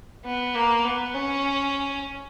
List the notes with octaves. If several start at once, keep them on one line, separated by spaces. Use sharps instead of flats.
B3
A#3
B3
C#4